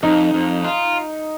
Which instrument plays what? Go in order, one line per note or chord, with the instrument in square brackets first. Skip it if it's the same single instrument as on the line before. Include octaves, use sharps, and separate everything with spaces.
[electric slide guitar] F2 [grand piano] D#4
[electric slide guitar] F2
F4